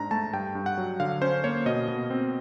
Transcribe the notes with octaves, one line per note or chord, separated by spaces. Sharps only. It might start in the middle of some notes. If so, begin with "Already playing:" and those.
Already playing: G#2 D4 A#5
A3 A5
G2 G5
G2
F#5
F#3
D3 F5
C#4 C5
A#3 C#5
B2 D#5
B2
C4